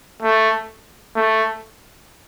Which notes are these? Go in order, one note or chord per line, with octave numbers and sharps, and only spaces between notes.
A3
A3